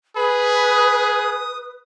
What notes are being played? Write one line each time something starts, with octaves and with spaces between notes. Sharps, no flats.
G#4 B4 B5
D#6